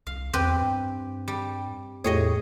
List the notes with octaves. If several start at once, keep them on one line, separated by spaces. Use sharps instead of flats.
C2 F5
E2 C4 G4 B4
G2
G3
E2 A2 G4 G#4 C#5 D#5